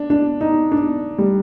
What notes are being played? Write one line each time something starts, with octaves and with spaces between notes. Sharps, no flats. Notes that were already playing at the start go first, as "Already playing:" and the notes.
Already playing: D4
D4
D#4
D4
G3